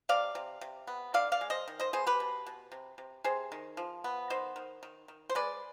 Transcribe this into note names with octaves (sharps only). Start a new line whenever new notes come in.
C3 D5 F5
C3
C3
B3
D3 D5 F5
D5 F5
G#3
C5 D#5
D#3
C5 D#5
B3 G#4 C5
G4 B4
B2
B2
C3
C3
C3 G#4 C5
D#3
F3
B3
D#3 C5 D#5
D#3
D#3
D#3
C5
G#3 B4 D5